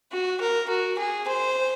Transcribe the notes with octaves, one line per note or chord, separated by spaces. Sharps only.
F#4
A#4
F#4
G#4
C5